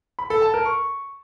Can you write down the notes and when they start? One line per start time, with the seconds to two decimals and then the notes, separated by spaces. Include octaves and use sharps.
0.19 B5
0.30 A4
0.42 A5
0.54 A#4
0.65 C#6